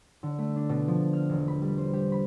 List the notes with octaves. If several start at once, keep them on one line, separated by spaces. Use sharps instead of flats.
D3
A3
D4
B2
F3
F6
E1
B5
G3
C5
G4
B5